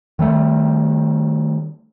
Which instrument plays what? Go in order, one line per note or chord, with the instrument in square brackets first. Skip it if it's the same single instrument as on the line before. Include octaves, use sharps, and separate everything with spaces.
[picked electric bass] D#3 G3 A3